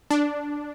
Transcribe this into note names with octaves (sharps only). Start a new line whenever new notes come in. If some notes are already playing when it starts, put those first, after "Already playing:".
D4